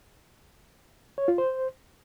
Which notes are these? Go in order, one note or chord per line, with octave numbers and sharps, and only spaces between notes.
C#5
F4
C5